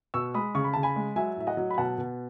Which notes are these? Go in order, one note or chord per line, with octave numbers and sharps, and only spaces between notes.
B2 C#6 E6
G#3 B5 D#6
C#3 C#6
B5
C#3 A5
G#5 B5
G#3
F#3 E5 G#5
A2 E5
D#5 F#5
F#3
B5
B2 F#5 A5
B2